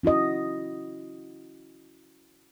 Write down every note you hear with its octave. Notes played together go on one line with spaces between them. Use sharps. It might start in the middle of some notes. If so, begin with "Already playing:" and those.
C#4 E4 F#4 D#5